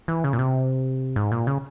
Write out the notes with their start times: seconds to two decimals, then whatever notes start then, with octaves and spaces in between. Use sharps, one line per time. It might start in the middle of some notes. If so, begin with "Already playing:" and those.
0.08 E3
0.24 C#3
0.33 A#2
0.39 C3
1.16 G#2
1.32 A#2
1.47 C#3